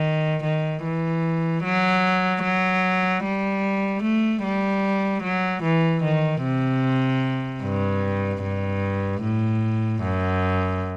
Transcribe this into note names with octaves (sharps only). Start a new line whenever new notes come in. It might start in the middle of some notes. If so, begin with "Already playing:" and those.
Already playing: D#3
D#3
E3
F#3
F#3
G3
A3
G3
F#3
E3
D#3
C3
G2
G2
A2
F#2